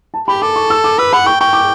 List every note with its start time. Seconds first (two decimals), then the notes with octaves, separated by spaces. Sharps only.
0.14 A5
0.28 G4 B5
0.42 A4 D6
0.56 C#6
0.70 E6
0.84 D6
0.98 B4 E6
1.13 F#5 B5
1.26 G5 C#6
1.40 G5 C#6
1.53 D6